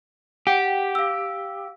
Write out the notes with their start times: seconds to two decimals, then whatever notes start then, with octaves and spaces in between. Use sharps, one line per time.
0.47 G4 F#5 G5
0.95 F5 E6